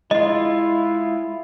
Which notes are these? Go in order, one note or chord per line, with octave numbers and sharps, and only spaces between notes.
G#3 E4 F4 D#5